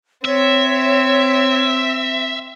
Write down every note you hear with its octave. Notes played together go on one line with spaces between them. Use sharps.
C4 C#5 E5